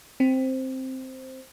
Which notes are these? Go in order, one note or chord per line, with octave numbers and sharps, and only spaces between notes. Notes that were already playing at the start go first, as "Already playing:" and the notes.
C4